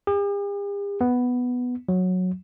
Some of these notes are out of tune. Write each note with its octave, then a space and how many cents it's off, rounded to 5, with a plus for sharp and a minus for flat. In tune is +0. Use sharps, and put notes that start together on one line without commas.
G4 +45
B3 +0
F#3 -10